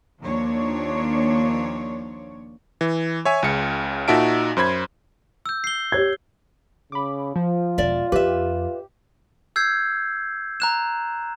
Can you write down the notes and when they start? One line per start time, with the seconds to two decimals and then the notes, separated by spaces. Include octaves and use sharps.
0.22 D#2 F3 A#3 D4 C#5
2.81 E3
3.25 C#5 E5 G#5
3.43 C#2 C#3 C#7
4.08 A#2 D#4 F#4 E5 A5 D7
4.57 F#2 C5 B5 G#6
5.46 E6 G6
5.64 C7 G7
5.92 G4 C#5 G#6
6.92 C#3 B5 D6
7.36 F3 F4
7.78 E1 D5 E5
8.12 F2 G4 B4 E5
9.56 E6 G6 G#6 C7
10.60 A#5 F#6 E7